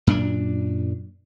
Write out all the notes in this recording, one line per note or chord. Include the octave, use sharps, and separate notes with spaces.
F#2 A#2 B3 D4